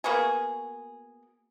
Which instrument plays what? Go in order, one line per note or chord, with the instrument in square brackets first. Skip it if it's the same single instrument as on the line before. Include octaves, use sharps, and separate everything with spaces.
[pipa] A#3 B3 F#4 G#4